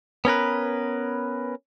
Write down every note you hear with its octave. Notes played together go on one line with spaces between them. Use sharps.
B3 C#4 A#4 B4